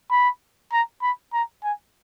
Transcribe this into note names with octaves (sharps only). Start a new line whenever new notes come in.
B5
A#5
B5
A#5
G#5